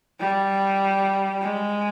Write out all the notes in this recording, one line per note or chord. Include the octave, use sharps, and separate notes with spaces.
G3
G#3